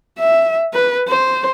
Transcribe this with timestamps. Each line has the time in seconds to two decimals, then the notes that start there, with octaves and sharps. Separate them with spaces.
0.19 E5
0.73 B4
1.08 C5